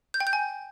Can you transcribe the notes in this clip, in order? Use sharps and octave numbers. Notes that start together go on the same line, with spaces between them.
G6
G5
G6
G#5